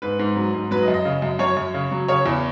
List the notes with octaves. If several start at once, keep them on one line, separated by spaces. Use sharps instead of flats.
G#2 B4
G#2
F#3
G#2
F#3 B4
D#5
F#2
D#5
C#3
F#2
F#2 C#5
F#2
C#3
F#3
C#3 C#5
E2